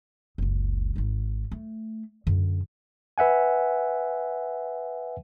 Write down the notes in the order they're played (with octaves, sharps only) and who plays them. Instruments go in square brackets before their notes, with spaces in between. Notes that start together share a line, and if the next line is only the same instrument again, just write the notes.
[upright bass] F#1 C#2
G#1 D#4
A3
F#2 D3
[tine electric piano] B4 E5 F#5 G#5